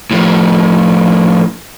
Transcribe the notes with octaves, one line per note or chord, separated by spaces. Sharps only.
A2 F3